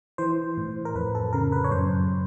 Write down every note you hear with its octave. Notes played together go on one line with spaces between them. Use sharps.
E3 C5
A2
A#4
F2 B4
A4
C#3 A#4
B4
C#5
F#2 C5